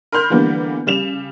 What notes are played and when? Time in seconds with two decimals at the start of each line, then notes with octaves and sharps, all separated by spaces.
0.12 A#4 B5 C6 F6 G6
0.30 D3 E3 G3 A#3 B3
0.86 C#3 G3 E7 F7